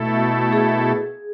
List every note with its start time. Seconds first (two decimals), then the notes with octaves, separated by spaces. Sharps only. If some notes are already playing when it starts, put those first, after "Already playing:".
Already playing: B2 A3 E4 A4
0.53 G#4